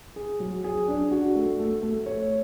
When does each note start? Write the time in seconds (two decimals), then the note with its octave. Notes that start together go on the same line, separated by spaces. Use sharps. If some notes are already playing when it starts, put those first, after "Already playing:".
0.16 G#4
0.40 F#3
0.64 G#4
0.88 D4
1.11 F#4
1.35 A3
1.59 A3
1.83 A3
2.06 C#5